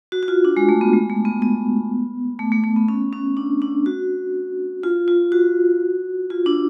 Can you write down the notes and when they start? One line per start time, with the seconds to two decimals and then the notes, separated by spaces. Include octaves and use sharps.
0.12 F#4
0.23 F#4
0.28 F4
0.45 D4
0.57 G#3
0.69 A3
0.81 B3
0.93 G#3
1.10 A3
1.25 B3
1.42 B3
2.39 A3
2.52 A3
2.64 A3
2.76 B3
2.88 C#4
3.13 C#4
3.37 D4
3.62 D4
3.86 F#4
4.84 F4
5.08 F4
5.32 F#4
6.30 F4
6.46 D4